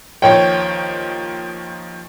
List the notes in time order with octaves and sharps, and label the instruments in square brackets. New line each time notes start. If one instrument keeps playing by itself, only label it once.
[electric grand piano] D#2 D#3 F3 [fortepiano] C#5 G5